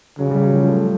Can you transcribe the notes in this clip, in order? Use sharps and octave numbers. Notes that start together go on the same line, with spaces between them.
C#3 F#3
G3
F#3
F3
A3